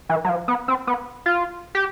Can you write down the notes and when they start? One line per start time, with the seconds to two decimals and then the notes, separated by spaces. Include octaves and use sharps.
0.09 E3
0.24 F#3
0.29 F3
0.48 B3
0.68 C4
0.87 B3
1.26 F4
1.75 G4